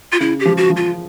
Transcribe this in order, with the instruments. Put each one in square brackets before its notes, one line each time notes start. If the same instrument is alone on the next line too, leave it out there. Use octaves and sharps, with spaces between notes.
[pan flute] F4
[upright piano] C#3 [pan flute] E4
[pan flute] G4
[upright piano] F3
[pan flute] F#4
[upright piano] F3
[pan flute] F4